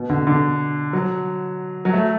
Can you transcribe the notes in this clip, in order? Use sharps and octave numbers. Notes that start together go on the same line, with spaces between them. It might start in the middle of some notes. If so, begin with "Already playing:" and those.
Already playing: B2
D3
D3
F#3
F#3
A3